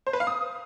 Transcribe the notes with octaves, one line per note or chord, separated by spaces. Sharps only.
C5
B4
F5
D#6